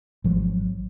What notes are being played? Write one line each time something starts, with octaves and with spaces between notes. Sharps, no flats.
G#1 F3 F#3